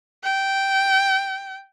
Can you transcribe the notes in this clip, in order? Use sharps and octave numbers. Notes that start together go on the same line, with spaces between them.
G5